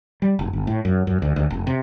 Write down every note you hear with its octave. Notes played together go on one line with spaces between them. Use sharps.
G3
F1
G1
A2
F#2
F#2
D2
D2
F1
C3